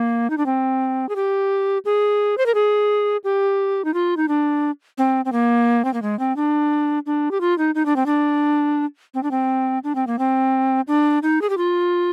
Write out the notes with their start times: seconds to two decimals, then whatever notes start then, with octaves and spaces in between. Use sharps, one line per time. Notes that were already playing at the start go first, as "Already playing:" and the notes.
Already playing: A#3
0.30 D#4
0.38 D4
0.46 C4
1.09 G#4
1.16 G4
1.85 G#4
2.38 C5
2.46 A#4
2.54 G#4
3.24 G4
3.85 D#4
3.94 F4
4.17 D#4
4.28 D4
4.98 C4
5.25 C4
5.32 A#3
5.85 C4
5.94 A#3
6.02 G#3
6.19 C4
6.37 D4
7.06 D4
7.31 G4
7.41 F4
7.58 D#4
7.75 D#4
7.86 D4
7.96 C4
8.06 D4
9.14 C4
9.23 D4
9.31 C4
9.84 D4
9.95 C4
10.07 A#3
10.19 C4
10.88 D4
11.23 D#4
11.41 G#4
11.50 G4
11.57 F4